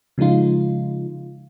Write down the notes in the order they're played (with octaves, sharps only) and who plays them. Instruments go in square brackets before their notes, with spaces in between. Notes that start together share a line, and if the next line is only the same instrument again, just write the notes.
[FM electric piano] C#3 F3 G#3 D#4 F4